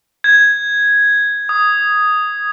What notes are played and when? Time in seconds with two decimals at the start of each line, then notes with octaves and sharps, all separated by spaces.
0.24 G#6
1.49 D#6